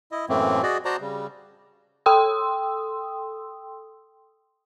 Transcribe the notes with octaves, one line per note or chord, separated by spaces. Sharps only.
E4 D#5
F#2 A2 E3 A3 A#3 C4
F#4 G#4 D5 D#5
F#4 C5 D5 A5 A#5
C#3 G3
A4 G5 C6 D#6 E6